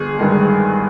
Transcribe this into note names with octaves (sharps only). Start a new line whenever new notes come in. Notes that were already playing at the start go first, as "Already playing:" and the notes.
Already playing: G1 G#4
G2 D#3 G#3